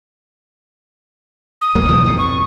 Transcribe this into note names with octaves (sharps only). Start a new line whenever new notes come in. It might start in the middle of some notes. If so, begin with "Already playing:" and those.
D#6
D1 F#3 A#3
B1 E2 A2
F2 G#2 B2
C#6